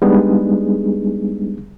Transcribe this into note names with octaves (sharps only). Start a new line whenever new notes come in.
G3 G#3 B3 D4 D#4 G#4